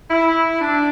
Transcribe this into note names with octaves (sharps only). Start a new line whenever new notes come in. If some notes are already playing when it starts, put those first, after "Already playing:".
E4
D4